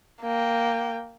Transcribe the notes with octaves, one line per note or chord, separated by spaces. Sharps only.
A#3 G5